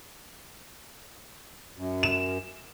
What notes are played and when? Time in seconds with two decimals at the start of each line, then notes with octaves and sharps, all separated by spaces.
1.77 F#2
2.03 E7